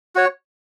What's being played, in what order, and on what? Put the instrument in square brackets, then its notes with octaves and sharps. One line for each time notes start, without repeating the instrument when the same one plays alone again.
[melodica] F#4 C#5